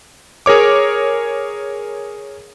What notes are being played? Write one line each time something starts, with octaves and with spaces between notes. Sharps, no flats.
G#4 A#4 C#5 D6